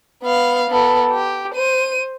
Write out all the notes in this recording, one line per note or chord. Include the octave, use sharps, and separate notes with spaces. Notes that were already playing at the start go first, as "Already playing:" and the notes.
B3 F5
B3 A4
G4
C5 D#7